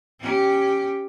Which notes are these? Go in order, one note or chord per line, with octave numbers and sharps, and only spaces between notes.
C#4 G4